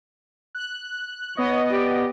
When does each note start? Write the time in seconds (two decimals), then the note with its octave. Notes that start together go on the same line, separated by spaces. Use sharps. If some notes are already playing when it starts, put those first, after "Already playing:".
0.55 F#6
1.37 B3 C#5 D#5
1.71 G4 D5